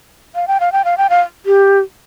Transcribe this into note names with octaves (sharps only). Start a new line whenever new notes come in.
F5
G5
F5
G5
F5
G5
F5
G4